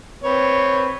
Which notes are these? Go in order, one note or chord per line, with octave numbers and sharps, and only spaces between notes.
C4 B4 C#5